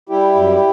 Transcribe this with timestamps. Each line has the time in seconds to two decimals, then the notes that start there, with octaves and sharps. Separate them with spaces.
0.09 G3 E4 G4
0.35 F#2